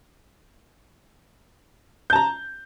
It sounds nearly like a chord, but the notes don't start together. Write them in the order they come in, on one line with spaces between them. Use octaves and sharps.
G6 A5 A#5